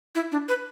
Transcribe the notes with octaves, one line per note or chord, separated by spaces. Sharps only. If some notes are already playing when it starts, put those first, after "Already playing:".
E4
D4
B4